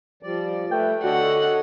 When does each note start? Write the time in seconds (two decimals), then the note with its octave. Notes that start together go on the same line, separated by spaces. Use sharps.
0.23 F3 G3 D5
0.71 A3 B4 G5
1.04 D3 F#4 A4 C#5 D#5 F#5